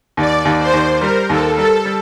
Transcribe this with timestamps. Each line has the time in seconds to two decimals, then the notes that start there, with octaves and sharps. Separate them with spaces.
0.17 D#2 D5
0.45 D#2
0.59 C5
0.73 D#2
1.01 G3 A#4
1.29 D#2 A4
1.57 G3 A4
1.85 G3